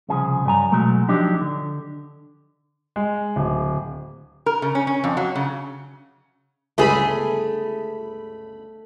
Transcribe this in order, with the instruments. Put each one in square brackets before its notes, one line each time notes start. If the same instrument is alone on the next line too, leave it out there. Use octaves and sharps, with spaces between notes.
[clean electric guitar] C2 C#3 F3 G#4
G2 F#3 G#5 A#5
B2 F#3 G#3 A3
F3 F#3 D4 D#4 G4
D3
[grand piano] G#3
D1
[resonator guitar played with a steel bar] A#4
C#3
C#4
C#4
F2
F#3
C#3
[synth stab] G1 C#2 B5 [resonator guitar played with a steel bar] A3 G#4